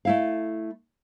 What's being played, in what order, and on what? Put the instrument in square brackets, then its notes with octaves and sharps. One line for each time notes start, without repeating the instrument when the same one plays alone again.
[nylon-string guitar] A3 E4 F5